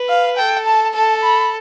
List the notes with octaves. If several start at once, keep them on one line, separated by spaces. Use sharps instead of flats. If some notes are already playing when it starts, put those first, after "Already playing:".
Already playing: B4
F5
A4 G5
A5
A4 A5
B5